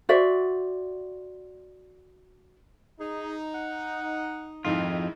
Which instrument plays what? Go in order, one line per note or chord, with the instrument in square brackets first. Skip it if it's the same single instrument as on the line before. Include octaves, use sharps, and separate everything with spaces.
[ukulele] F#4 C5 D5 E5
[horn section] D#4 [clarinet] G#4
[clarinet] F#5
[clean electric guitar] F2 F4 [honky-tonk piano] G#2 D#3 E4 [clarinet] D#5